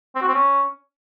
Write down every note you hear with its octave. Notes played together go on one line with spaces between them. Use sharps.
C4
F#4
C4
C#4